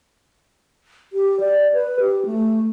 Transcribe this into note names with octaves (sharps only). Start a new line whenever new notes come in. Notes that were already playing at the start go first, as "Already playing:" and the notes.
G4
D5
B4
G4
A3